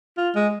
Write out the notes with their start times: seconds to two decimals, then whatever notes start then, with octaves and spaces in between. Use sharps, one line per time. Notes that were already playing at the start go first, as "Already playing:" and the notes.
0.17 F4
0.35 G#3